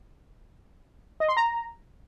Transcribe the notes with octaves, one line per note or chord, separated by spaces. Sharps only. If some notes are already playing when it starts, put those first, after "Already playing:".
D#5
C6
A#5